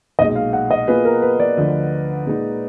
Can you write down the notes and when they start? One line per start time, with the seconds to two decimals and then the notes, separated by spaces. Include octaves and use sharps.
0.19 B1 A#2 G#3 D#5
0.36 F5
0.53 F#5
0.71 D#5
0.87 B2 A#3 F4 G#4 B4
1.05 A#4
1.22 B4
1.40 D5
1.57 D2 D3 F3
2.26 A#2 G#3 D#4